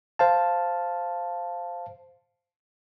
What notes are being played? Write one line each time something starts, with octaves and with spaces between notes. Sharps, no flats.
C5 F5 A5